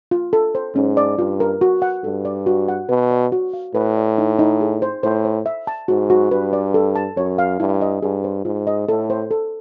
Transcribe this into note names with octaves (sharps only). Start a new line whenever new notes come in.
F4
A4
C5
G#2 C#4
D5
G2 F4
A#4
F#4
F#5
G2 A4
D5
F#4
F#5
B2 B4
D5
F#4
F5
A2 B4
D5
D#4
D#4
G#4
C5
A2 C5
C5
E5
A5
G#2 F#4
F#4
G2 B4
D5
A4
A5
F#2 C#5
F5
G2 E4
D#5
G2 G#4
C5
G#2 F4
D#5
A2 A4
C5
A4